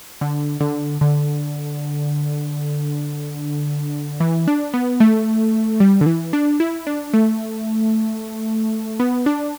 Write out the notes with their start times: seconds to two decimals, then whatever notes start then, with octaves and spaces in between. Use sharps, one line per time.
0.21 D3
0.61 D3
1.01 D3
4.20 E3
4.48 D4
4.74 B3
5.00 A3
5.80 G3
6.01 D3
6.06 E3
6.33 D4
6.60 E4
6.87 D4
7.13 A3
9.00 B3
9.26 D4